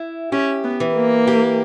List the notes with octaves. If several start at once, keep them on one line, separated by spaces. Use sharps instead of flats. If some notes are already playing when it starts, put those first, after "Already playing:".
Already playing: E4
C#4 G4
B3
E3
A#3
G4